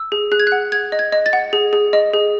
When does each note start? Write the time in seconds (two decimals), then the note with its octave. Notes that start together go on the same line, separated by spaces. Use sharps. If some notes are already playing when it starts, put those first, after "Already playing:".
Already playing: E6
0.12 G#4
0.32 G#4 F#6
0.40 G#6
0.47 F#6
0.52 F#5
0.72 G#4 G#6
0.92 D#5
0.99 G#6
1.12 D#5
1.26 A6
1.33 F#5
1.53 G#4
1.73 G#4
1.93 D#5
2.14 G#4